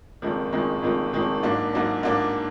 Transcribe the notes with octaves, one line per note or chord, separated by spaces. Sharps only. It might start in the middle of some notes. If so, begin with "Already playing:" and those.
F#1 F2 D#3 G#3
F#1 F2 D#3 G#3
F#1 F2 D#3 G#3
F#1 F2 D#3 G#3
G#2 F#3 A#3 D4
G#2 F#3 A#3 D4
G#2 F#3 A#3 D4